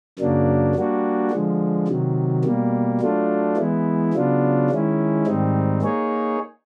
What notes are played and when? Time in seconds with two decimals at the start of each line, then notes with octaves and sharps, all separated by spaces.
0.19 F#2 C#3 F#3 A#3 D4
0.75 G3 A#3 D4 F#4
1.31 D3 F3 G#3
1.88 C3 D#3 F#3
2.44 B2 G3 A#3
3.01 F#3 A3 D4 F4
3.57 E3 G#3 B3 E4
4.13 C#3 F#3 B3 D4 F4
4.70 D#3 G#3 C#4 E4
5.27 G#2 D#3 G3 C4 D#4
5.82 A#3 D#4 G#4 C#5